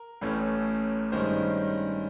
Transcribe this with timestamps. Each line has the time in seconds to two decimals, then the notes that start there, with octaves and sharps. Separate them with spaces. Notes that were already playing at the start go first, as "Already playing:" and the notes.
Already playing: A#4
0.21 A1 A2 E3 A3 C#4
1.12 G2 D#3 G#3 C#4 C5